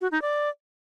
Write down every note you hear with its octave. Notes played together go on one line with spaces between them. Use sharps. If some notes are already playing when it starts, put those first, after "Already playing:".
F#4
D#4
D5